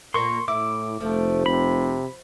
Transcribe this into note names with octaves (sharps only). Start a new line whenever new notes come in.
A#2 A#3 C6 C#6
A2 E4 D6
F1 F3 A3
C3 B5